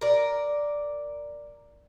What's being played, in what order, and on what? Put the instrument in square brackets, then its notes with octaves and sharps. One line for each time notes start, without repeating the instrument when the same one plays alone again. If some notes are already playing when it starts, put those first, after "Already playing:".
[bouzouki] A#4 D5